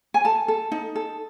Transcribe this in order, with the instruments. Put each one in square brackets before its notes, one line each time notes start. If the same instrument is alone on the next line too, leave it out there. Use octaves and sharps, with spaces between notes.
[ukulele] G#5
A4 A5
A4
D#4
A4